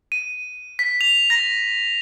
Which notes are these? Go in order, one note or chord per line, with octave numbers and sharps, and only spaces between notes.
D#7
B6
F7
A#6